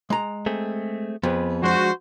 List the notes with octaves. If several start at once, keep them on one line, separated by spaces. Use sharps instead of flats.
G#3 A#5
A3 C4 G#4
F2 B3 G#4 B4
F3 G#3 D4 F#4 C5